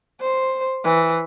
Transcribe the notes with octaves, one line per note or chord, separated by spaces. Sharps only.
C5
E3